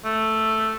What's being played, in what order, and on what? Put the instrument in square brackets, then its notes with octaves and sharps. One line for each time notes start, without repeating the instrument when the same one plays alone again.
[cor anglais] A3